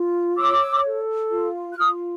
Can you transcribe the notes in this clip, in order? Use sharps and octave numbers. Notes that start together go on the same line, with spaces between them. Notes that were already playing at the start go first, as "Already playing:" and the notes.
Already playing: F4
C#5 D6 E6
A4
F4
F#6
F4 D#6 F6